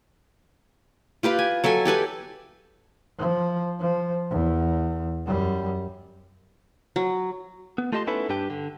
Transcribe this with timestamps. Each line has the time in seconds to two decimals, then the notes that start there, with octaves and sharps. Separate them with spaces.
1.23 F4 G4 B4 F5
1.39 G#5
1.64 F#3 A4 E5 G#5
1.85 G4 A4 B4 G#5
3.18 F3
3.80 F3
4.30 E2
5.25 F#2 G3
6.96 F#3
7.78 B3
7.92 A3 F4 G4 D#5 A5 C6
8.07 B3 C#4 D#4 E4 A4 B4
8.29 G2 D4 G4 B4 G5
8.50 D3